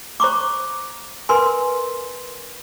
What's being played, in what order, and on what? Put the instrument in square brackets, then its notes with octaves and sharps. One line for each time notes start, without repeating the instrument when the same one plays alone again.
[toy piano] C5 A#5 C#6 D6
A#4 B4 G#5 C6